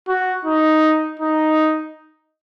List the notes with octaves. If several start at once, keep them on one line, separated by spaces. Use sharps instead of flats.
F#4
D#4
D#4